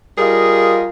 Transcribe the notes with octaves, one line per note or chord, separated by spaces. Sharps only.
G3 F4 G#4 A#4 D#5